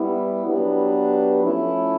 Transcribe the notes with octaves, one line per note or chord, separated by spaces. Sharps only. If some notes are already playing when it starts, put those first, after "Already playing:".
Already playing: G3 B3 E4
F#3 B3 D4 G4 B4
F3 A3 C#4 E4